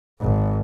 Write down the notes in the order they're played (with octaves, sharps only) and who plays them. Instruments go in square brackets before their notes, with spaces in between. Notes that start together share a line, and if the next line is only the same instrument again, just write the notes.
[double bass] G#1